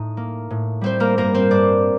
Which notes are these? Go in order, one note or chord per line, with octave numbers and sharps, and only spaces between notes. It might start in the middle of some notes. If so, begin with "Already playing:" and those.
Already playing: A2 D#4
A#3
A2
G3 C4 C5
A#3 A#4
G2 A#3 A#4
C4 C5
G2 D4 D5